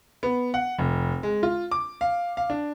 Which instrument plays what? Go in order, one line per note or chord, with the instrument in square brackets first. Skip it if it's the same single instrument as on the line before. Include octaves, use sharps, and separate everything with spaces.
[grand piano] B3
F#5
F1
G#3
F4
D6
F5
F5
D4